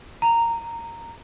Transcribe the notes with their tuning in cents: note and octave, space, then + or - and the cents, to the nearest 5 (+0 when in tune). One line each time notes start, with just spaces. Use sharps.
A#5 -10